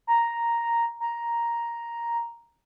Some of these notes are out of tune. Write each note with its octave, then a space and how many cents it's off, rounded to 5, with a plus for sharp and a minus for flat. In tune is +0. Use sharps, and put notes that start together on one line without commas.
A#5 +0
A#5 +5